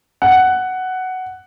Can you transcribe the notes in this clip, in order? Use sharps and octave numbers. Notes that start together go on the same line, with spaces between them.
F#5